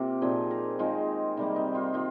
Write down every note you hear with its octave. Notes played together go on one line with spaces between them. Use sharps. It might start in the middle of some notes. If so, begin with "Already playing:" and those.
Already playing: C3 A#3 F4 G4
A#2 F3 C4 D#4 G#4
A#4
D#3 G#3 C4 F4
C3 G3 A#3 D#4
D#4
F4
D#3 F4